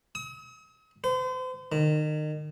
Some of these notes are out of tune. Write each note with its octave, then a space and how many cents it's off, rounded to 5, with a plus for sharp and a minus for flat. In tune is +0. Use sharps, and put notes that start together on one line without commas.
D#6 +45
C5 -40
D#3 -30